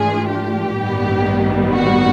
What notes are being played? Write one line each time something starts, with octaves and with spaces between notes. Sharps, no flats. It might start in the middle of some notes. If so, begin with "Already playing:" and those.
Already playing: G#2 E3 A3 D4 F4 G#4
G4
A1 G2 D#3 G3 B3
F#4